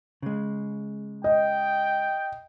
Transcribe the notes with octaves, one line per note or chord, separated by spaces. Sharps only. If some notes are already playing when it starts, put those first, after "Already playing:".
C#3 G#3
D#5 G5